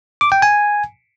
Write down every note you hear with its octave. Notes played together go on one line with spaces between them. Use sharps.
D6
G5
G#5